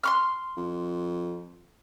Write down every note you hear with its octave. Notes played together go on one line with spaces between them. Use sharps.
C6 C#6 F6
F2